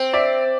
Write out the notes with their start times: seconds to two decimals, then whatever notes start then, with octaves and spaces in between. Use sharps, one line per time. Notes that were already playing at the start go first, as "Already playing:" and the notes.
Already playing: C4
0.13 D5 E5